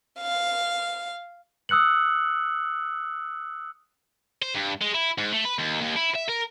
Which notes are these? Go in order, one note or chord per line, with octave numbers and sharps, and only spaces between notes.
F5
D#6 E6 F#6 C#7 F#7
C5
G2
G#3
E4
G#2
A3
B4
D#2
D#2
E4
E5
A#4